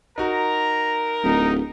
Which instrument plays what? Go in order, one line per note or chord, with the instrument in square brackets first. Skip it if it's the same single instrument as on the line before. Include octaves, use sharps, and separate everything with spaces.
[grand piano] D#4 F#4 [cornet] A#4 [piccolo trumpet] A#5
[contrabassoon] D1 [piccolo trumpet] D#4